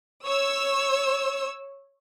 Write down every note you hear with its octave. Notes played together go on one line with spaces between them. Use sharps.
C#5 E6